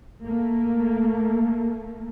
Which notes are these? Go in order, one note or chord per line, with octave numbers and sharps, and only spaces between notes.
A3 A#3